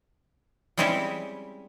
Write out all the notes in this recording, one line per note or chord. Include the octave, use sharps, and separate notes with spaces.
G3 G#3 C4 C#4 E4 G4